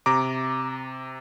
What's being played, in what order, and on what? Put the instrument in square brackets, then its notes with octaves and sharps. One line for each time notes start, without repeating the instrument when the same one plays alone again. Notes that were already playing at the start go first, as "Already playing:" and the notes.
[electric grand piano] C3 A#5 D6